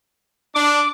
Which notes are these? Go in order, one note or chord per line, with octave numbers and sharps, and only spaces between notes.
D4 D6